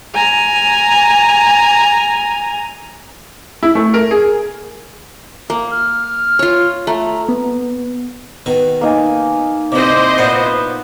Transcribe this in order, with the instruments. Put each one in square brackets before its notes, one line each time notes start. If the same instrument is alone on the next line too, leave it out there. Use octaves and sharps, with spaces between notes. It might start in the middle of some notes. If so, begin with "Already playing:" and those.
[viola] G#5 A#5
[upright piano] E4
A3
A#4
G#4
[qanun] A#3
[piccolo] F6
[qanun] F4 C#5
[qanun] A3 [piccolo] A#5
[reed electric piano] B3
[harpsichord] B2 D#3
[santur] A#3 D#4 G#5
[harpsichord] C3 C4 [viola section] E4 C5 D#5 [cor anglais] D5
[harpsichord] A#2 F#5 [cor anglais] B3